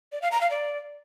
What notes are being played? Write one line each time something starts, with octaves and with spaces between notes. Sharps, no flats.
D5
F5
A#5
F5
D5